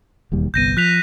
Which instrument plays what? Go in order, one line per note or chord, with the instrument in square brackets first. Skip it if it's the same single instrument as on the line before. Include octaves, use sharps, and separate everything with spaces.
[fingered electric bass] E1 D#2 G3
[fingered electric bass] G1 C2 B3 [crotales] G6 A#6 D#7
[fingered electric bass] F3 [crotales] F#6 B6 F7